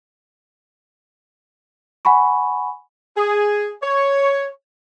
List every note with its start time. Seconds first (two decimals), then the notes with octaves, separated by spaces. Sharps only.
2.05 F#5 G#5 B5 C#6
3.17 G#4
3.83 C#5